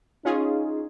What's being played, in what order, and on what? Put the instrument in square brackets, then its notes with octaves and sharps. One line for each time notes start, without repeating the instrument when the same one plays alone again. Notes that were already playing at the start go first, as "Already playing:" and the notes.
[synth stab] C#4 F4 G#4 [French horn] D#4